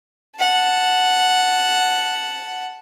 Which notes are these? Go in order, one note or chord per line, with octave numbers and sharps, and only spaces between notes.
F#5 A5